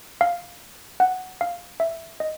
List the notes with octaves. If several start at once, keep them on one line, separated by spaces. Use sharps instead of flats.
F5
F#5
F5
E5
D#5